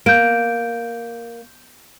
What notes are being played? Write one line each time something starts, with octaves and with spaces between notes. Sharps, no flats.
A#3 G6 D7